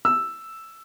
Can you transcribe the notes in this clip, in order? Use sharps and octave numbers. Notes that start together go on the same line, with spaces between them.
E6